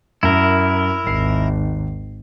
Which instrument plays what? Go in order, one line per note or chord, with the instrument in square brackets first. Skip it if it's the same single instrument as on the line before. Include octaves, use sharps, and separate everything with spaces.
[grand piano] F#2 [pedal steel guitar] E4 A#4
[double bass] G#1 [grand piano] D#2 C7